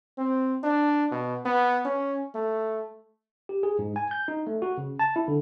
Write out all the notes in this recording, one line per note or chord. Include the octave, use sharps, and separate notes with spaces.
C4
D4
B2
B3
C#4
A3
G4
G#4
G#2
G#5
G6
D#4
A3
F#4
C#3
A5
E4
D3